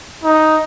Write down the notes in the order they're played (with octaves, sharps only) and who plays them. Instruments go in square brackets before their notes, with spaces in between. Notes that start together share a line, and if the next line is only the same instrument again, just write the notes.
[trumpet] D#4